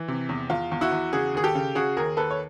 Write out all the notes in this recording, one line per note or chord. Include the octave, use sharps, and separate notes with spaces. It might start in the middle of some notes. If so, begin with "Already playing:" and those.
Already playing: E3
C3
E2
E2 F4
E2
E4 F#4
E2
C#3 F#4 G#4
D#2 G#4
G4 A4
C#3
C#3 F#4 G#4
D#2 G#4 A#4
D#2 A4 B4
C#5